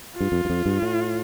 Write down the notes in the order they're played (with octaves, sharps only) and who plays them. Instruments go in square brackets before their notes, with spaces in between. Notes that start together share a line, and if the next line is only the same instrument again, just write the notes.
[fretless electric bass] G2 [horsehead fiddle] F4
[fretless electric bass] F2
G2
F2
G2
A2